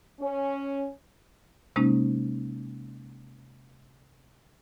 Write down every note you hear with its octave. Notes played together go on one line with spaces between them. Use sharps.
C#4
C3 G#3 A#3 C#4 D#4